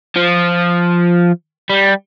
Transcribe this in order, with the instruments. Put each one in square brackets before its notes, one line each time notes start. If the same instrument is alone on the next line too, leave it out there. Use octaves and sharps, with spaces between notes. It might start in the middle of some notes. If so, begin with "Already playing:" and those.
[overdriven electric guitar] F3
G3